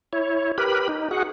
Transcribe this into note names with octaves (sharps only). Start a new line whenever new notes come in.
E4 C#5
G4 A#4 B4 B5
D#4
F#4 G#4 F#5